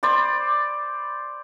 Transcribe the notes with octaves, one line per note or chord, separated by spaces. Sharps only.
C5 D5 B5